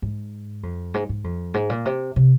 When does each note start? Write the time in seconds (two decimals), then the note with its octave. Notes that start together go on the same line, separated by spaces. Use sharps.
0.02 G#2
0.63 F2
0.94 G#2
1.09 G#2
1.24 F2
1.54 G#2
1.70 A#2
1.85 C3
2.16 C3